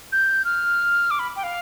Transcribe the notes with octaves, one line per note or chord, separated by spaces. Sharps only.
G6
F6
D6
B5
G5
F5